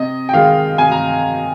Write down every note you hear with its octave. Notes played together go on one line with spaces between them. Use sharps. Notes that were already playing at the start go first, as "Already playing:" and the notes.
Already playing: C3 D#5
G5
D#3 G#3 F5
C3 G#5
A#5